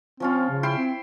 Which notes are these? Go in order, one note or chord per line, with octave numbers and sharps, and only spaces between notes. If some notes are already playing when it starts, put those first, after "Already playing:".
F3 C4 C#4 F4
C#3
E4 G5 C6
C4